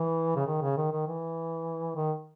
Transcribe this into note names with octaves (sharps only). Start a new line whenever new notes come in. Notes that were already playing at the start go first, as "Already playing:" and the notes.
Already playing: E3
C#3
D#3
C#3
D#3
D#3
E3
D#3